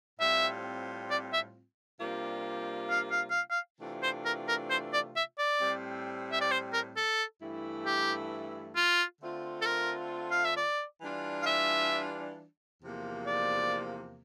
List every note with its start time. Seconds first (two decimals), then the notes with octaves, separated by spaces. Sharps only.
0.20 A2 G3 C4 F4 E5
1.10 D5
1.33 E5
2.00 C3 G3 A#3 D4 F4
2.90 F5
3.11 F5
3.30 F5
3.51 F5
3.80 C3 E3 A3 D4 F4
4.03 C5
4.25 A#4
4.48 A#4
4.70 C5
4.93 D5
5.16 E5
5.38 D5
5.60 A2 G3 C4
6.32 E5
6.41 D5
6.51 C5
6.73 A#4
6.96 A4
7.41 G2 E3 A3 E4
7.86 G4
8.76 F4
9.22 D3 A3 C4 F4
9.62 A4
9.66 A#4
10.31 F5
10.45 E5
10.57 D5
11.01 E3 G3 D4 F4
11.42 F5
11.46 E5
12.82 E2 C3 F3 A#3
13.26 D5